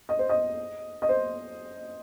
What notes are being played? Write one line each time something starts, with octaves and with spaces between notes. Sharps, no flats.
D#5
C5
D#5
D#5
C5